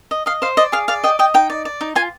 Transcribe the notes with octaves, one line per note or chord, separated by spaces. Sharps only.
D#5
D#5 F5
C5 F5
D5 D#5
G#4 F5
D5 F5
D#5 G5
D#5 G5
D#4 G5
D5
D5
D#4
F4 G#5